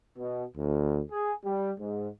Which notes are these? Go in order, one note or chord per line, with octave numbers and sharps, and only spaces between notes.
B2
D2
G#4
G3
G#2